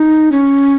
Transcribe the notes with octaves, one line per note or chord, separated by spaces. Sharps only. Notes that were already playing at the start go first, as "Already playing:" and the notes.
Already playing: D#4
C#4